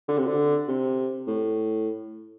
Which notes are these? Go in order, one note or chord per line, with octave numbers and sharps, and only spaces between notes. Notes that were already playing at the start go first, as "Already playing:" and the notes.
D3
C3
D3
C3
A2